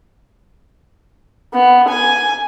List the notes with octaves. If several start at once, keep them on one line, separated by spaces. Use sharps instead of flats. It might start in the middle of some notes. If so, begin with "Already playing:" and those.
B3
G#5